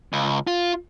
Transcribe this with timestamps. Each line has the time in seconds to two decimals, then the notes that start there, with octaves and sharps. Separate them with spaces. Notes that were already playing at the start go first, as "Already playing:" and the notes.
0.13 C#2
0.47 F4